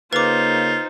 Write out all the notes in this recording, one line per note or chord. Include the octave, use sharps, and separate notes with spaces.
C#3 A#3 D#4 F4 B4 C5 D6